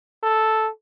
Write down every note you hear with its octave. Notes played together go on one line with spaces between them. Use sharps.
A4